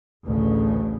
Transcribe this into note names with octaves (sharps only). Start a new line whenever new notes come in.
A1 D2 C#3